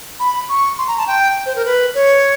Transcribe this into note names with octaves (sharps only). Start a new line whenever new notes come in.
B5
C#6
C6
A#5
A5
G5
C5
A#4
B4
C#5